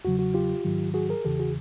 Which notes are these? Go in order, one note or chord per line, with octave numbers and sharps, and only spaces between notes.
E2 C#3 F#3 F#4
F#4
F4 G4
G#2 D#3 F#3
F#4 G#4
G#4 A#4
E2 C#3 E3 G4 A4
F#4 G#4